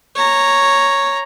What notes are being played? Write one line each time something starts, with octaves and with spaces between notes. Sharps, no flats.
C#5 A#5